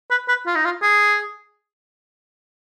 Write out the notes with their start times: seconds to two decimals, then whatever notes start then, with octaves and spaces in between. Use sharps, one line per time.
0.11 B4
0.29 B4
0.47 F4
0.55 D#4
0.65 F4
0.82 G#4